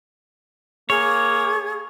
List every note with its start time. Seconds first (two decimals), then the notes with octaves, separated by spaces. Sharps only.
0.90 A#3 G#4 C#5